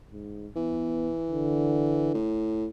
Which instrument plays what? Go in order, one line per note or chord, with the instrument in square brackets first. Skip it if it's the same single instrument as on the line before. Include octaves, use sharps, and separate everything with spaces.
[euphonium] G#2
[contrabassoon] E3 [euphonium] B3
[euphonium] D3
[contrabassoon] A2